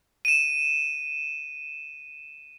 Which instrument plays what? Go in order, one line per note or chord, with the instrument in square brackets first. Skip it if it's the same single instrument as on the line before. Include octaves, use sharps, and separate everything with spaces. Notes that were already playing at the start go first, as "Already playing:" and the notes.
[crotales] D#7 E7